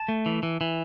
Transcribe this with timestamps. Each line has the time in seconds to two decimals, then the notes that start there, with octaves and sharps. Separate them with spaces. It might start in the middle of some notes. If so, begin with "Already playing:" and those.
Already playing: A5
0.08 A3
0.26 E3
0.43 E3
0.61 E3